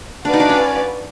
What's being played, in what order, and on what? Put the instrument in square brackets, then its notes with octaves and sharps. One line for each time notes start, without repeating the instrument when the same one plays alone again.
[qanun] D4 [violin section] F#4 B4 D5 F5
[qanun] D#4
D4
C#4